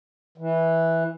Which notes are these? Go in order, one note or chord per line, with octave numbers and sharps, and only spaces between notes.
E3